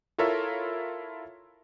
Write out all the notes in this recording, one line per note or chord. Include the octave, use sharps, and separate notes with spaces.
E4 F4 A4 A#4 C#5 E5